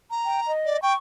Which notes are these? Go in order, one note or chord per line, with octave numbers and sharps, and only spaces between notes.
A#5
G5
D#5
D5
G5 C#6